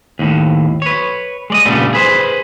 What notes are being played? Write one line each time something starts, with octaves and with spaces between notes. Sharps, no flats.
D#2 A2
B4 C#5
G#3 D5 D#5
A#2 C#3 G3 A3 B3 D4
G#4 B4 C5